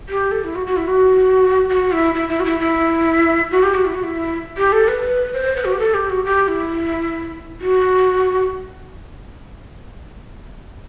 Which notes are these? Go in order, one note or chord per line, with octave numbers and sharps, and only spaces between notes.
G4
A4
E4
F#4
F#4
E4
F#4
F#4
E4
E4
E4
F#4
E4
E4
F#4
G4
F#4
E4
F#4
E4
G4
A4
B4
C5
B4
F#4
G4
A4
G4
F#4
G4
E4
F#4